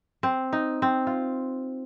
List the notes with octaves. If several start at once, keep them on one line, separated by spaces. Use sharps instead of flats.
C4
D#4
C4
F4